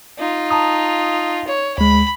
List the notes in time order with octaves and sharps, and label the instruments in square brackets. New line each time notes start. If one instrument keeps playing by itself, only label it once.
[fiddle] D#4 F4
[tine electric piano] A5 A#5 D#6
[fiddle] C#5
[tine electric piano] D2 G#3 [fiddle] B5